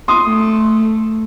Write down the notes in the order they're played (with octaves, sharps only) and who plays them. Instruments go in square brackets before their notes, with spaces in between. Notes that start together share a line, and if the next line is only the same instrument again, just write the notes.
[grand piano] C6 D#6
[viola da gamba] A3